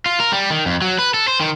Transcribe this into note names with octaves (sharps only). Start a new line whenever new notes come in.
F4
A#4
G3
D#3
F2
F#3
B4
A4
C5
D#3